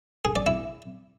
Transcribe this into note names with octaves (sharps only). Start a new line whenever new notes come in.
G#4
D5
E4